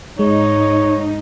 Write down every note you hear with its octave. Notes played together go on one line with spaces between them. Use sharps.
G#2 G#3 D#4 C#5